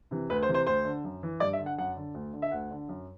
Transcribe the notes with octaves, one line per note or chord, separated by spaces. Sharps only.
C3 E3
D2 B4
C5
C3 E3
C5
D2 C5
D3
F#2
E3
G2 D5
E5
D3
F#5
F#2 F#5
D3
D2
D3
E5
D2 F#5
D3
F#2